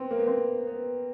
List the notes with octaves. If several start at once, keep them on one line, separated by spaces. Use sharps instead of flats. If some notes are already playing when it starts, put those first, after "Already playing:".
Already playing: B3 C4
A#3
B3
C4
B3